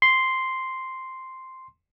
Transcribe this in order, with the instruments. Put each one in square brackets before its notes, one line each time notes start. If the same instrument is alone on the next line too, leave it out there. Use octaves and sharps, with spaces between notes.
[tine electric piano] C6